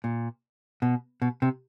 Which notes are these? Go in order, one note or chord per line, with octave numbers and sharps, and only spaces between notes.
A#2
B2
B2
C3